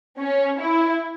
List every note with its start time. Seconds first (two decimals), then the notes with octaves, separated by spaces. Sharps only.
0.18 C#4
0.60 E4